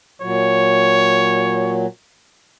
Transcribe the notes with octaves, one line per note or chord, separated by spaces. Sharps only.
A#2 F#3 C#5